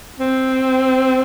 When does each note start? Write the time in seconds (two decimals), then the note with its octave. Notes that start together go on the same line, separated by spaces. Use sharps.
0.20 C4